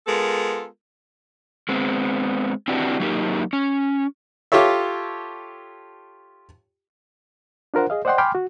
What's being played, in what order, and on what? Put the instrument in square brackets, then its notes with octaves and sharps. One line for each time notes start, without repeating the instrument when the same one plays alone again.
[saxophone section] G#3 B3 F4 A4 A#4
[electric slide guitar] G#3 B3 C4
C4 D4 E4 F#4 G4 B4
F#3 A#3 D#4 G4 A#4
C#4
[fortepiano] F4 G4 A4 C#5 E5
[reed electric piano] D4 F4 A#4 C5 F#5
G#4 D#5 F5
C5 D5 D#5 F#5 G5 C6
G5 G#5 B5 C6 D6 F6
F#4